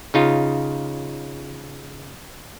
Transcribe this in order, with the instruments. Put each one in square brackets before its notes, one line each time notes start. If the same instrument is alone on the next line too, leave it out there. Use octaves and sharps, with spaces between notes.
[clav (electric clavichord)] C#3 D#4 F4